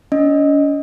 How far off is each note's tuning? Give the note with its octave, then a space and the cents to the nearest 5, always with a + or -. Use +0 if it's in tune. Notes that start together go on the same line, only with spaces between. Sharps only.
C#4 +45 D#5 +0